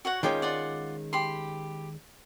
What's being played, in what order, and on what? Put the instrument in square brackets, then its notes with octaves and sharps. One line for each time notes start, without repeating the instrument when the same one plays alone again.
[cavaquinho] F#4 C#5 F#5
[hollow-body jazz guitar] D#3 G#3 C#4 [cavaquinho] F4 G5 D6
[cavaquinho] F4 D5 F#5
G4 B5 C6